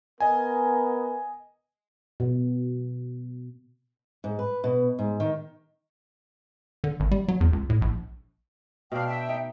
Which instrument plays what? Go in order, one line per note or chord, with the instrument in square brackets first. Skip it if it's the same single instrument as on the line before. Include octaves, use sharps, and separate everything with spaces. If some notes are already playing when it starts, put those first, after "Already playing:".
[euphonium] B3 [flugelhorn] A#4 [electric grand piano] D#5 G#5
[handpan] B2
[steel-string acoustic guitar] G#2
B4
B2
G#2
D#3
[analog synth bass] D3
G#1
G3
F#3
E2
C#2
A2
A#1
[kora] B2 D4 [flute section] F5 G5
[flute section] E5 G5
[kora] D#4